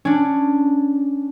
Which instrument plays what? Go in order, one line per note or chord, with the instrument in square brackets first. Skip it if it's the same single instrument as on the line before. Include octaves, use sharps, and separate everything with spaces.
[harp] C#4 D4